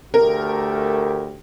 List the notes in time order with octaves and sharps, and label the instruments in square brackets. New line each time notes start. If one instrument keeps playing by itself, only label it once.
[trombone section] D2 A3 G4 [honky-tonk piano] A#4